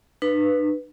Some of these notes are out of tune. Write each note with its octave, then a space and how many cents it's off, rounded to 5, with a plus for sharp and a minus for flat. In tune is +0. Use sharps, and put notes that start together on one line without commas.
D4 +45 B4 +0